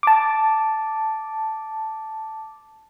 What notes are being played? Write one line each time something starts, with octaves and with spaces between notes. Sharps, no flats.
A5 D6